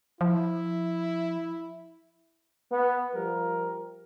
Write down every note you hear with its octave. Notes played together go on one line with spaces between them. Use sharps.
F3 E4
B3
F3 G3 A#4